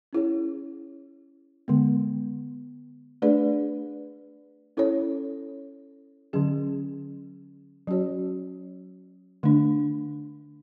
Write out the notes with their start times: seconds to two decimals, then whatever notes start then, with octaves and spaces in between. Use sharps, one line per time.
0.13 C#4 E4 G#4 C#5
1.68 D3 G#3 B3
3.22 A3 D4 G#4 B4 D5
4.77 C#4 E4 A4 C#5
6.33 D3 F#3 C#4 G#4
7.87 F#3 C#4 F#4 C#5
9.43 D3 A3 D4